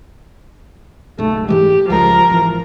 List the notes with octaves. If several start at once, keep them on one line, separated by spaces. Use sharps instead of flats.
F#1 B1 A3
G#2 E3 G#3 G4
C#2 F3 G#3 A#4
G#1 E3